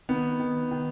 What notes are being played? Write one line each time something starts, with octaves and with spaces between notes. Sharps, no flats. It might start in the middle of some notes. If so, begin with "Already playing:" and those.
D#3 B3
D#3
D#3